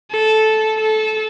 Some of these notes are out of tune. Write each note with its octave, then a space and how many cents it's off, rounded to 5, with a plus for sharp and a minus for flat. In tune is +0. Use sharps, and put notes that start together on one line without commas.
A4 -10
A4 -20